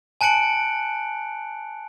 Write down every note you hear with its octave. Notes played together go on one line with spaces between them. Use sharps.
G#5 A5 F#6 C#7 D7 F#7